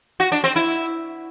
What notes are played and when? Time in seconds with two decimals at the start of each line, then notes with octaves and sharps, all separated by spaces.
0.20 F#4
0.32 D4
0.44 C4
0.56 E4